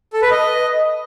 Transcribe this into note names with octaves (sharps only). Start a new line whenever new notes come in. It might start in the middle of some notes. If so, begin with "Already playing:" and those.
A4
B4
D#5